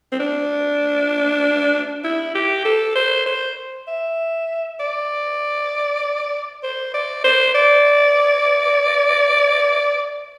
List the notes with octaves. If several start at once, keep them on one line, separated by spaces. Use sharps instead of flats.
C4
D4
E4
G4
A4
C5
C5
E5
D5
C5
D5
C5
D5